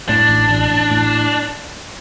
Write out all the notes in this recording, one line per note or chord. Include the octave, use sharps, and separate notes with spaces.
A2 D4
A1
A1
A1
A2